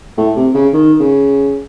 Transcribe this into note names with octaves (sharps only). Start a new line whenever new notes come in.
A2
C3
C#3
D#3
C#3